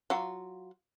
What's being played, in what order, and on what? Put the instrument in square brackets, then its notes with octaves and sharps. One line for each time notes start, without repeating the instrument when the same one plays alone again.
[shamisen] F#3 F4 F#4